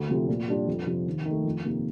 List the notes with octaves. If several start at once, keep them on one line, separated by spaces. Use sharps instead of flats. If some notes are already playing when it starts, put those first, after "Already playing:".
Already playing: D2
C3 F3 A3
A#2
G3 D4 F4
F2
C3 F3
D#2
D#3
A3
F2
C3 D#3 A#3